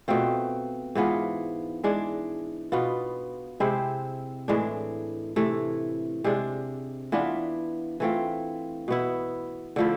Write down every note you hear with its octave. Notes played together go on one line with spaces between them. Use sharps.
B2 A3 C4 F4
G#2 E3 B3 F4
E3 G#3 D4
B2 B3 F4
C3 G#3 C4 E4
A2 E3 G#3 D4
C3 E3 A3
C3 G#3 D4
E3 B3 D4 F4
E3 A3 C4 F4
B2 B3 E4
D3 F3 A3 E4